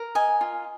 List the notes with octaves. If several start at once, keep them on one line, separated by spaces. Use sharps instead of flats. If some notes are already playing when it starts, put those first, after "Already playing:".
Already playing: A#4
D#5 G#5
F4